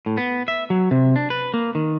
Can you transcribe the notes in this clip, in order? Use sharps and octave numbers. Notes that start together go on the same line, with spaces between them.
A2
B3
E5
F#3
C3
D4
B4
A#3
D#3